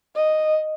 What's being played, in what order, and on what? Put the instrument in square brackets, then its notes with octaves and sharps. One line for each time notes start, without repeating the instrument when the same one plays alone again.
[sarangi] D#5